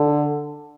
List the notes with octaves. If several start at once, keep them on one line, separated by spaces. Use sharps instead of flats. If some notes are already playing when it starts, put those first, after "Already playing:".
Already playing: D3